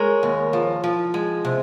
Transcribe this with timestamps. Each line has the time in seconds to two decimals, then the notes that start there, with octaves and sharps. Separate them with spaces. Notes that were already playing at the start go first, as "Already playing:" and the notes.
Already playing: G#3 A#4 C#5
0.23 D#2
0.53 F3
0.84 F3
1.14 G#3
1.45 C3